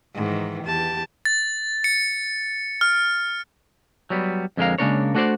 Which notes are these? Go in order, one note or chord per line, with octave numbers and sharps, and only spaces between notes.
G#2 D#3 E3
E2 G4 A5
A6
C#7
F6
F#3 G3 B3
F2 D3 G#3 F4 A#4 F5
C#3 G#3 A#3 D4 A#4 C#5
A3 D4 F#4 G#4 C5 D5